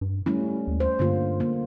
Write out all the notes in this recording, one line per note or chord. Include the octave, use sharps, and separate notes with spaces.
G2
G3 A3 C#4 E4
D#2
C5
G2 D3 A#3 F4
A#3